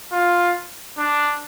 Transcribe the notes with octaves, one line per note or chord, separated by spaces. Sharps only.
F4
D4